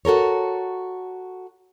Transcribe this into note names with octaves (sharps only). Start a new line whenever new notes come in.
F#4 A4 A#4 C#5